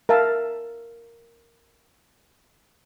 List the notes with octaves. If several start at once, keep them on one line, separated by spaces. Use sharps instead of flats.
A#4 E5 F5 A5